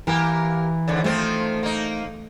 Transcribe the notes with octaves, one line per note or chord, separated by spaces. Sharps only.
E3 A#3 G4 A#4
D#2 G#2 D3
D#3 F3 A3 C4
A#3 D#4